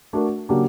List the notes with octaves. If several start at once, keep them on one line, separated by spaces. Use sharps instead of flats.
A3 D4 F#4 A#4
C#3 F#3 A#3 D4 G4